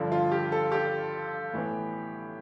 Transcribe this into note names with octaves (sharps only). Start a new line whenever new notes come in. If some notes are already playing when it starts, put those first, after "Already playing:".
Already playing: G2 D3 F3
F4
G4
A4
G4
A2 E3 B3